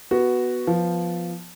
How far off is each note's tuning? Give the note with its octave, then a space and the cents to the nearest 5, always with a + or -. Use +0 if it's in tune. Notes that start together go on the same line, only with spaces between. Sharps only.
B3 -5 F#4 +0
F3 +0 B3 -5